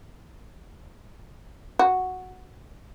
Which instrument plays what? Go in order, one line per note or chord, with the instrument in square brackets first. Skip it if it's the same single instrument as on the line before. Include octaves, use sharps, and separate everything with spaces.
[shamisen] F#4